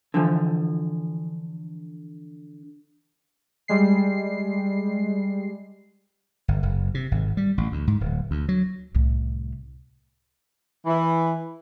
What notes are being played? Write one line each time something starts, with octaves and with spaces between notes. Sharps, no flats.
D3 E3 F3
G3 G#3 C7
G1
F#1
C3
G#1
G3
A1
D2
G#2
D1
D2
F#3
C2 A2
E3